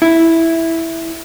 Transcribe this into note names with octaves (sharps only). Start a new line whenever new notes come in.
E4